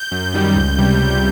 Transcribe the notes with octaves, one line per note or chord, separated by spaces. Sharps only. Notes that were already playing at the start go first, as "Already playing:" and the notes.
Already playing: G6
F#2
D#3 G3
C#2
C3 G3